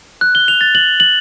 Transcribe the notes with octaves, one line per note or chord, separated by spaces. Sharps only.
F#6
G7
F7
A6
F#7
F#7